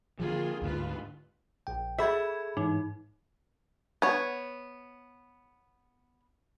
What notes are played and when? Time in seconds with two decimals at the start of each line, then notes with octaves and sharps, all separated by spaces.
0.20 D3 D#3 F3 A#3 F4 G#4
0.62 D2 G#2 D3 F4 B4
1.67 A#1 G5
1.98 G#4 A4 E5 B5 G#6
2.57 G#2 E3 D#4
4.02 B3 C#5